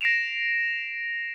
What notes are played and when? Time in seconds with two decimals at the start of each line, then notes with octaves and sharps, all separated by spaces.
0.01 A#6 C7 D7 E7 F7